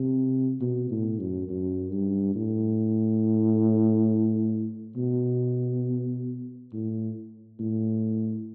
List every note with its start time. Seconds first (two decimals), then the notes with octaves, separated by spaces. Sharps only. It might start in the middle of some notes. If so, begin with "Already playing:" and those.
Already playing: C3
0.61 B2
0.91 A2
1.19 F#2
1.49 F#2
1.92 G2
2.35 A2
4.97 B2
6.72 A2
7.59 A2